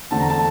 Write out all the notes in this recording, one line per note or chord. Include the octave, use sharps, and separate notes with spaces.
E2 D3 A3 C4 A5
A#5
A5